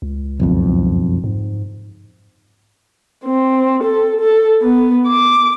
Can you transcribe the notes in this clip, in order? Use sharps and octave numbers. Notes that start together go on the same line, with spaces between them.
C#2
F#1 B1 F2
G#2
C4
A4
A4
B3
D6